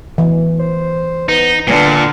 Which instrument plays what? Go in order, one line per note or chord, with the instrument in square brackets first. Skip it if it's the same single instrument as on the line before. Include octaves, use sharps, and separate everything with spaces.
[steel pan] E3
[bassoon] C5
[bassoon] B3 [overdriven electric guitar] D#4
[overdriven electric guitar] A#2 [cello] D3 [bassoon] B3